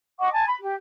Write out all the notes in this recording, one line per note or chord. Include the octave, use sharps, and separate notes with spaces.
D#5 F#5 C#6 D6
G#5 A5
B5
G4